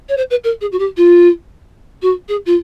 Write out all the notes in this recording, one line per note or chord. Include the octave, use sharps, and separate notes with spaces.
C#5
C5
B4
A#4
G#4
F#4
G4
F4
F#4
G#4
F4